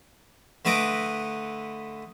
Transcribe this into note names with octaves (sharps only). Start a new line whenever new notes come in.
D3 A3 B4 D#5 D6